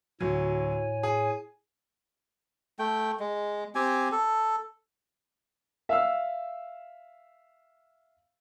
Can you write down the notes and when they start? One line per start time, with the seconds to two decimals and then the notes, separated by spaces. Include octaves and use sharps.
0.21 D2 A2 F#3 C#5 G#5
1.03 G#4
2.79 A3 G5
3.20 G#3
3.75 C4 G4 G#5
4.12 A4
5.89 E5 F5 E6